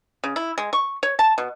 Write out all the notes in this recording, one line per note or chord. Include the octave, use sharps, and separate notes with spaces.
C#3
E4
G#3
C#6
C#5
A5
B2